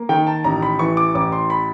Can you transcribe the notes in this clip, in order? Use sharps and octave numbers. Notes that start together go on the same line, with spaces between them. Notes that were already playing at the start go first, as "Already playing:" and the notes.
Already playing: A#3
D#3 G5
A5
A1 A#5
B5
E3 C#6
D6
A1 D6
C6
B5